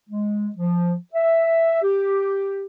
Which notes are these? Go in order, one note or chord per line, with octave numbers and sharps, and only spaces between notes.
G#3
F3
E5
G4